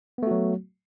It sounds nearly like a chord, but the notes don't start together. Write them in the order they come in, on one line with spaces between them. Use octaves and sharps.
B3 A3 F#4 F#3